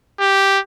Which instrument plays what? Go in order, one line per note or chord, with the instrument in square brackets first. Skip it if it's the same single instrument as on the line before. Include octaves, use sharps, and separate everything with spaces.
[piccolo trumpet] G4